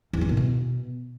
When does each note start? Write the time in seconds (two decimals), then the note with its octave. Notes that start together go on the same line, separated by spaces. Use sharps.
0.13 E2
0.21 E3
0.29 A#2
0.37 B2